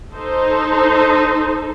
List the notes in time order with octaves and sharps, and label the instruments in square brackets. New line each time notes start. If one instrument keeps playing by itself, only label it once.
[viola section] D#4 A4 C5